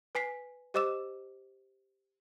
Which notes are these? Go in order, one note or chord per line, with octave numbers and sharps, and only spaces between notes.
B4 G#5 B6 C7
G4 C5 D#5 D6 E6 E7